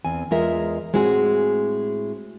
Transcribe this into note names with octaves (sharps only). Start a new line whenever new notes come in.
E2 C4 G#5
E2 G#3 F4 A#4 E5
A2 G#3 C4 E4 F#4 G#4